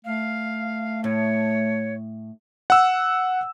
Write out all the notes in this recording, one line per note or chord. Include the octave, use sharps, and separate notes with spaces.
A3 F5
A2 C#5
F#5 E6